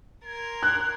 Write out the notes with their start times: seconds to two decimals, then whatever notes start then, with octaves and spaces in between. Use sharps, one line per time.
0.24 A#4 C6 G#6
0.63 F#6